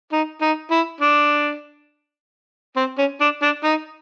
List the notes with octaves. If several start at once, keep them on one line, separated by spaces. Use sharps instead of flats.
D#4
D#4
E4
D4
C4
C#4
D4
D4
D#4